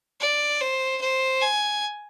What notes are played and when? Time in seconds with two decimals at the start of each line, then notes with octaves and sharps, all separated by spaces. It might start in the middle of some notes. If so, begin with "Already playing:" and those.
0.20 D5
0.61 C5
1.01 C5
1.41 G#5